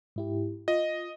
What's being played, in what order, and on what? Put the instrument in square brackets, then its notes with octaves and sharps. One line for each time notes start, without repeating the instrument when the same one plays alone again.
[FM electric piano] G#2 E4 G4
[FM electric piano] F4 [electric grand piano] D#5